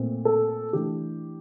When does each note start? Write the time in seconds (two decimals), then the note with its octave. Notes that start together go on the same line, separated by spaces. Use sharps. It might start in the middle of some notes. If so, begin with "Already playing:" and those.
Already playing: A#2 A3 C4
0.25 A4
0.73 E3 A3 D4 G4